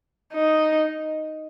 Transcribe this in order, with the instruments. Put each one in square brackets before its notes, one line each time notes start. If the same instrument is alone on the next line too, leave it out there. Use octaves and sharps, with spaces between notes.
[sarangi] D#4